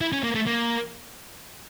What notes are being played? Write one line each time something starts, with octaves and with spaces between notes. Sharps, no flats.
E4
C#4
A#3
A3
A#3